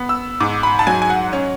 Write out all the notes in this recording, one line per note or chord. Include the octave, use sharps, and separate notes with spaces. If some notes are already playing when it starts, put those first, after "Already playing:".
Already playing: B3
E6
G#2 D6
B5
A5
F#3 G#5
G#5
F#5
C#4